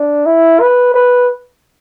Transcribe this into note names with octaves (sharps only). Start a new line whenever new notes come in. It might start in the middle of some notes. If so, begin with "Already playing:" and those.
Already playing: D4
E4
B4
B4